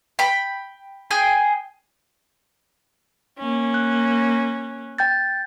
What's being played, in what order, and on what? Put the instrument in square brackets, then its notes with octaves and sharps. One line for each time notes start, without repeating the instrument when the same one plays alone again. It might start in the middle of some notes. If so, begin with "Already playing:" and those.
[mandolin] G5 B5
G#4 G5 G#5
[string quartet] A#3 C#4
[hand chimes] F#6
G5 G6 A6